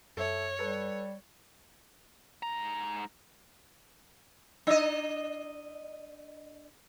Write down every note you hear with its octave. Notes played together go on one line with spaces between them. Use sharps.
F#2 A4 C#5 E5
G3 A4 B4
G#2 A#5
D4 D#5